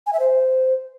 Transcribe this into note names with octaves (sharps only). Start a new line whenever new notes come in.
G#5
E5
C5